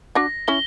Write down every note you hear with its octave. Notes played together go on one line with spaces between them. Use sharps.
D4 F#4 A#6
C#4 E4 G7